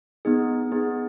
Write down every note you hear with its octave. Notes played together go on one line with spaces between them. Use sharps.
B3 D#4 G#4
B3 D#4 G#4